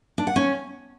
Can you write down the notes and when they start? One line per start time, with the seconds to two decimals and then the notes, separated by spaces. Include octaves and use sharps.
0.18 D4
0.27 F#5
0.36 C#4